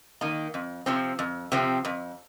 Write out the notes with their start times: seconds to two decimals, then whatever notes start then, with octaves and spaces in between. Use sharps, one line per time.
0.21 D#3 A#3 D#4
0.54 F2
0.86 C3 F3 C4
1.19 F2
1.52 C3 F3 C4
1.85 F2